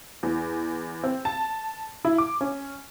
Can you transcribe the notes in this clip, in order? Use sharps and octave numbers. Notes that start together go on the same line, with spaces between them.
E2
C4
A5
E4
D6
C#4